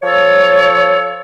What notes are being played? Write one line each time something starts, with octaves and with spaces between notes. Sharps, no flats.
F3 A4 C#5